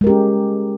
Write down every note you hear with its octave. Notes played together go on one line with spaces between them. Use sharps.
G#3 C#4 G4 A#4